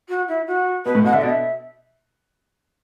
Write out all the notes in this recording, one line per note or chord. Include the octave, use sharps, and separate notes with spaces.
F#4
E4
F#4
B2 B4
A2
B2 F#5
D3 E5
B2 D5
E5